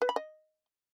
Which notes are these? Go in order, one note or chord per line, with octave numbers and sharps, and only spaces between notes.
B4
B5
D#5